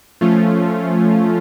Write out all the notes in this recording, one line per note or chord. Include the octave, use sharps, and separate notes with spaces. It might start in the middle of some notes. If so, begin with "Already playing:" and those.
F3 A3 C#4 F4